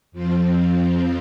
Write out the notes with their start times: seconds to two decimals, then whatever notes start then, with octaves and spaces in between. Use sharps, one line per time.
0.12 F2 F3 C4 F4